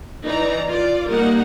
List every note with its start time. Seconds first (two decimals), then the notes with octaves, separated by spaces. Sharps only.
0.24 E3 D#4 D5 A#5
0.67 F4 D5
1.09 G3 A#3 D#4 A#4 F#5